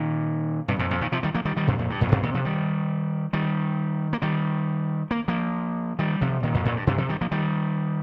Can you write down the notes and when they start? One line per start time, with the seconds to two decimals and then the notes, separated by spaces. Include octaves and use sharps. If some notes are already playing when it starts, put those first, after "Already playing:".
Already playing: A#2 D#3
0.68 G2 C3
0.79 F2 A#2
0.91 F2 A#2
1.01 A#2 D#3
1.12 C3 F3
1.23 D#3 G3
1.34 F3 A#3
1.45 D#3 G3
1.56 D#3 G3
1.67 G2 C3
1.79 F2 A#2
1.90 G2
2.01 F2 A#2
2.12 G2 C3
2.23 A#2 D#3
2.34 C3 F3
2.45 D#3 G3
3.33 D#3 G3
4.13 A#3
4.22 D#3 G3
5.11 A#3
5.28 F3 A#3
5.99 D#3 G3
6.21 C3 F3
6.43 A#2 D#3
6.54 F2 A#2
6.65 F2 A#2
6.76 G2
6.87 G2 C3
6.98 C3 F3
7.09 D#3 G3
7.21 F3 A#3
7.31 D#3 G3